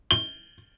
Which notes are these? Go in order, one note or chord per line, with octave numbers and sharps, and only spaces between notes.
G7